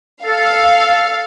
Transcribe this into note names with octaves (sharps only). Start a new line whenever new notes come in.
A4 F5